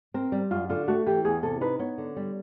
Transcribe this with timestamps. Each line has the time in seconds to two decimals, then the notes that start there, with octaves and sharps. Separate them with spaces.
0.14 C4 A#4
0.32 G3
0.51 F#2 F4
0.69 D3 F4
0.88 A3 F#4
1.07 E3 G4
1.25 E2 G#4
1.43 C3 A4
1.61 D#4 B4
1.79 B3 C#5
1.98 D3
2.16 G3